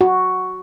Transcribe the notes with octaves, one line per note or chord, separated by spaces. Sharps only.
F#4